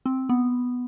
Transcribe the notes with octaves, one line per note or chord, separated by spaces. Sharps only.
C4
B3